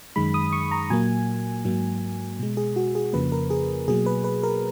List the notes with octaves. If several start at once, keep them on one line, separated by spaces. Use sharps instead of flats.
F#2 D#3 G#3 B5
D#6
C#6
A#5
A#2 F#3 A#3 G#5
G#2 F#3 A#3
B2 G#3
G#4
F#4
G#4
F2 C#3 F3 A#3 B4
A#4
G#4
B2 F#3 A#3 G#4
B4
B4
A#4